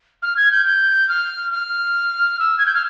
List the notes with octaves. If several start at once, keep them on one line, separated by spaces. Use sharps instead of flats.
F6
G#6
G6
G6
F6
F6
E6
G#6
G6
F6